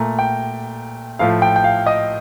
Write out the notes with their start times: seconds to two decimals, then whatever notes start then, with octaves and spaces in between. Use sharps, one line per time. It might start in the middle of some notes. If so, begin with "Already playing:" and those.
Already playing: A#2 A3 A#5
0.19 G5
1.19 A2 F3 A3 F5
1.42 G5
1.56 G5
1.64 F5
1.86 D#5